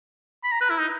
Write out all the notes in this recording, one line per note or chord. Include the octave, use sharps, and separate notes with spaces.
B5
A#5
B4
E4
D#4